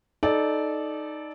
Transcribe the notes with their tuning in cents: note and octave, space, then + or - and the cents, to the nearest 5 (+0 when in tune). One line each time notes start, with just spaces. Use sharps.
D#4 +0 A4 -20 D5 +0